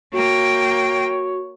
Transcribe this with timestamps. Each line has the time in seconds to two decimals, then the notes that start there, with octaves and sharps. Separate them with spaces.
0.14 A#3 F#4 C#5 G5